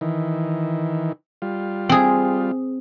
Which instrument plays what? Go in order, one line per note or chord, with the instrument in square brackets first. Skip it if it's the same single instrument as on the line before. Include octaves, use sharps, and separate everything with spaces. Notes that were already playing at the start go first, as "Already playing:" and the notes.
[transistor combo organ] D#3 E3
G3 F4
[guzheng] C4 G#4